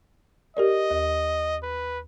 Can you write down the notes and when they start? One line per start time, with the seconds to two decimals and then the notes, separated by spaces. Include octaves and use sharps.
0.57 G4 A#4 D5 D#5
0.91 D#2
1.63 B4